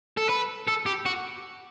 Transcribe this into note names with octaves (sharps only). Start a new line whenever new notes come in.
A4
B4
A4
G4
F#4